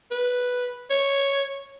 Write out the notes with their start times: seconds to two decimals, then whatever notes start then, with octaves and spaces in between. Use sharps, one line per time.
0.11 B4
0.90 C#5